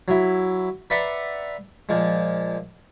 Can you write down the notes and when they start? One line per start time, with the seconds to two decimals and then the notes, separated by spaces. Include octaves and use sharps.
0.08 F#3 E4
0.90 B4 D5 E5 F#5 A#5 C6
1.89 A#2 F3 G#3